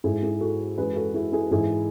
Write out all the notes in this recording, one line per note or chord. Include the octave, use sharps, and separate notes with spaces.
G#2 G#3 E4 G#4
E4 G#4
F#4 A4
F#2 E3 G#3 G#4 B4
F#4 A4
E4 G#4
E4 G#4
G#2 E3 G#3 E4 G#4